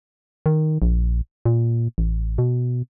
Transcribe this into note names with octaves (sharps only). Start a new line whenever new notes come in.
D#3
A#1
A#2
A1
B2